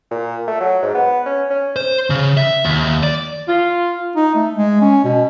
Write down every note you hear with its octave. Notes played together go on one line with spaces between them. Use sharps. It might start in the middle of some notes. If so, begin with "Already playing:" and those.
A#2
A3
F#3
G#2
B3
C#4
C#4
C5
C#3
E5
D#2
D5
F4
D#4
A3
G#3
C#4
B2